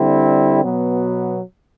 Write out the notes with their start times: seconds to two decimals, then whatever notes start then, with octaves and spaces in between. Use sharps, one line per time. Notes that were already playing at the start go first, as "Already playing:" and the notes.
Already playing: D3 G3 C4 E4
0.62 B2 F#3 B3